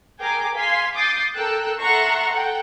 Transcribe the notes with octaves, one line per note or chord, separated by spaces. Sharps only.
G#4 A#4 G5 G#5 A#5 D6
F5 G#5 C6 G#6 B6
D6 D#6 G6 A6 C7
A4 A#4 G5 E6 F#6
A4 E5 F#5 A#5 C6 C#6
A4 F#5 G5